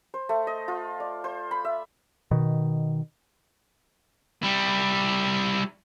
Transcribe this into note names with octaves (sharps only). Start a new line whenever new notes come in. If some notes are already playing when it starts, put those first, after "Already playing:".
C5
A3
D#5
F4
D5
C5
B5
E5
B2 D#3
G3 E4